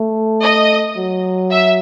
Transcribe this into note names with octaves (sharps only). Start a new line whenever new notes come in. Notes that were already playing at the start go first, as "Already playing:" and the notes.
Already playing: A3
D#5
F#3
E5